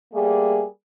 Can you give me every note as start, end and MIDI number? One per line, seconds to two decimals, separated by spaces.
0.14 0.64 55
0.14 0.64 57
0.14 0.64 58
0.14 0.64 68